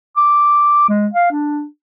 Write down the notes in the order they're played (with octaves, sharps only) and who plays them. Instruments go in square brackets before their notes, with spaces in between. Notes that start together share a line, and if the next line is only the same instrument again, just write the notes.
[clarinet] D6
G#3
F5
D4